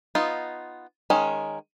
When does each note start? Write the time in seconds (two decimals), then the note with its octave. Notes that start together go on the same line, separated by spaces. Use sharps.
0.15 B3 D#4 F4
1.10 D#3 G#3 C#4